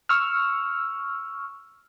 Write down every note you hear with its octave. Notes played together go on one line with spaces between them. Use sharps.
C#6 E6 F6